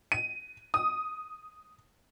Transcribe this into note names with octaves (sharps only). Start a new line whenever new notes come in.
D#7
D#6